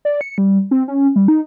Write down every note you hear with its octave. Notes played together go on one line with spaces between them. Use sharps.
D5
C#7
G3
C4
C#4
G3
D#4